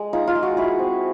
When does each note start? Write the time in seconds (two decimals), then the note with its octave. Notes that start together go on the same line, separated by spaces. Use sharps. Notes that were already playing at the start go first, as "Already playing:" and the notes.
Already playing: G#3
0.13 D#4 F4
0.27 F4
0.35 G#3
0.43 F#4
0.57 E4 G#4
0.79 C4